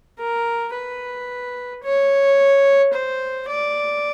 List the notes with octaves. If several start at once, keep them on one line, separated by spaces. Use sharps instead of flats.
A#4
B4
C#5
C5
D5